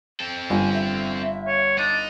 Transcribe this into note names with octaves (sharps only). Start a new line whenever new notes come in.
C4 A4
G1 G#5
E5
C#5
D4 D#4